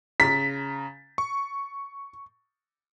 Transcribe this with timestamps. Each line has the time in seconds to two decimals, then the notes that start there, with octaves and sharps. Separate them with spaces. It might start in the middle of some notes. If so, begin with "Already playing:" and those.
0.20 C#3 A#5 A6 B6
1.18 C#6